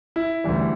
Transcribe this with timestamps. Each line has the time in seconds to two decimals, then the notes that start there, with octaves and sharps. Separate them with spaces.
0.16 E4
0.44 D2 C#3 E3 G3